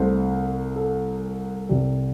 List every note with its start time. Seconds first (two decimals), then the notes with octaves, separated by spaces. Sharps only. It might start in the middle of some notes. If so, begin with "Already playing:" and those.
Already playing: C2 C3 A3 C5
0.76 A4
1.69 C2 C3 G3